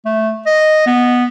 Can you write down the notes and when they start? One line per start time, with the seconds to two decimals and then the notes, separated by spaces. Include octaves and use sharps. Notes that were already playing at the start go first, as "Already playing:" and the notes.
0.05 A3
0.46 D#5
0.86 B3